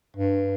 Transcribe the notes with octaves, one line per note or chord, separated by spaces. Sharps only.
G2